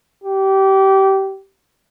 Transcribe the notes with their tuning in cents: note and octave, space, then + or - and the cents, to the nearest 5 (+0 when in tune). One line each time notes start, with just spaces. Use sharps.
G4 -25